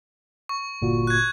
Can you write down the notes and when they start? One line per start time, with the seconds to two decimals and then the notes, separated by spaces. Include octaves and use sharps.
0.49 C#6
0.82 G1 A#2 F#4
1.07 F#6 G#6